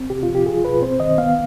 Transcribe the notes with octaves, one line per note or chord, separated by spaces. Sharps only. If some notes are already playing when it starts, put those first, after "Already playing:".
Already playing: C4
C3 G4
F4
F3
G4
F4 G#4
B2 B4
C4 C5
D#3 D#5
B3 F5